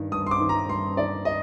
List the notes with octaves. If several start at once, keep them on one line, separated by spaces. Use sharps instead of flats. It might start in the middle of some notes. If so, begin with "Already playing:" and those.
Already playing: G2 D#3
G2 D#6
C6
D6
D#3
A#5
G2 C6
D#3 D5
D#5